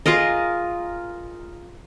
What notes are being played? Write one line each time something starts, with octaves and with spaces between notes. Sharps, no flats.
F4 G#4 A#4 D#5